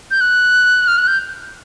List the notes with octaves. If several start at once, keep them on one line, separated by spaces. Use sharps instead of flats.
G6
F#6
F6
F#6
G6